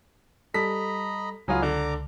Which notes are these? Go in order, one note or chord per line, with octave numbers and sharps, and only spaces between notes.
G3 A4 D#5 A#5 B5 B6
C#2 F#3 B3 F4 G#4 G#5
D3 A#5 D6